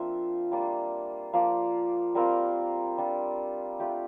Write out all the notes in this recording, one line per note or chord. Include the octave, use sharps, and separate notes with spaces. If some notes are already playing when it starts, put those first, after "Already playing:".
Already playing: F3 A#3 C4 D4 F4 E5
G3 A#3 D4 F4
F3 A#3 F4 D5
G3 C4 F4 A#4
G3 D4 F4
A3 D4 F4 G4